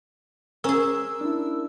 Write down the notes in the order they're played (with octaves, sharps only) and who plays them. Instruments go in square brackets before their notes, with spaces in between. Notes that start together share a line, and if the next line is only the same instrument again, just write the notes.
[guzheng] C#4 G#4 [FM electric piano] A#4 E6
[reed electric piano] D4 E4